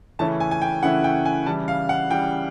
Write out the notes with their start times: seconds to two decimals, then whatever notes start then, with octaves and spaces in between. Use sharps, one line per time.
0.19 C#3 E3 A3 C#4 E4 A5
0.40 G#5
0.51 G#5
0.62 G5
0.83 C#3 E3 A3 C#4 E4 F#5
1.04 G5
1.25 G#5
1.46 C#3 E3 G3 A5
1.68 F5
1.89 F#5
2.10 C#3 E3 G3 G5